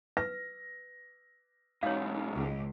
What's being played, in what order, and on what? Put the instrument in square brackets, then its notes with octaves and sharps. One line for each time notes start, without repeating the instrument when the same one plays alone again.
[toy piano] B4 [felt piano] A#6
[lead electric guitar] B1 G#2 [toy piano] C#5 F5
[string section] C#2